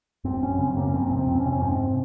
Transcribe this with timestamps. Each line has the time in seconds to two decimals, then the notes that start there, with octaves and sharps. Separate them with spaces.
0.24 F#2 C4
0.42 F#2 C#4
0.59 C#3 C4
0.77 F#2 A#3
0.88 C#4
0.94 F2 C4
1.11 C3
1.17 C4
1.28 F2
1.35 C4
1.40 C#4
1.45 C3
1.52 C#4
1.62 G#2 C4